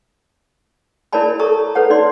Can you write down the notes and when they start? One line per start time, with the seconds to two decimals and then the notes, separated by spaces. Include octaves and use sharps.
1.13 E4 A#4 C#5 D5 A5 B5
1.39 A4 A#5 C#6 D#6
1.75 A4 B4 C#5 F#5
1.90 D#4 D5 C6